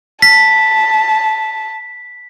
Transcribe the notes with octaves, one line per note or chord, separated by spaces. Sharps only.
A5 B6